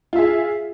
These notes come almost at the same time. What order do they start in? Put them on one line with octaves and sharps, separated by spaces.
F4 E5 G#4